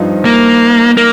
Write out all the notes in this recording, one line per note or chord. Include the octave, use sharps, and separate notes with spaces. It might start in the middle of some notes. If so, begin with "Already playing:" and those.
Already playing: G2 F3 C4 D#4
A#3
A#3